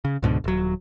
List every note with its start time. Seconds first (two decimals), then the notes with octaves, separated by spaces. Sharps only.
0.05 C#3
0.23 C#2 G#2 B2 D3
0.44 D#1 F#3